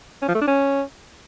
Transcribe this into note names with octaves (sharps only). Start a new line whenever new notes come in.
C#4
F3
A3
D4
C#4